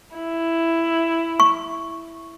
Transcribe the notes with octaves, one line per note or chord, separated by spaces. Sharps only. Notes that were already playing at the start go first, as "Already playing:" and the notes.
E4
C#6